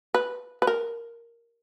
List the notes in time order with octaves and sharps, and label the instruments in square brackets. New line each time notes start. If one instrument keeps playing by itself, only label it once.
[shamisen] B4
B4
A#4